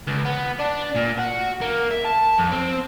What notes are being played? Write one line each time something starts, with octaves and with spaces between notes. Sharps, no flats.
C#2
B3
D4
A#2
F#4
A#3
E5
A5
F2
C4